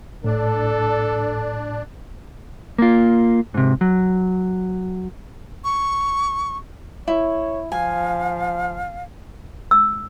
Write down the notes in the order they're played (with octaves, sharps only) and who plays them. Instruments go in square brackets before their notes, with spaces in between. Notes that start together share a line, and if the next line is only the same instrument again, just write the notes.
[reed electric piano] A2 [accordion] D4 [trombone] A4
[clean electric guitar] A#3 F4
G#2 C3
F#3
[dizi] C#6
[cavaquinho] E4 [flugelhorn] C#5
[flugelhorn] F3 [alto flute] F5 [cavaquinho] G#5
[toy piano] E6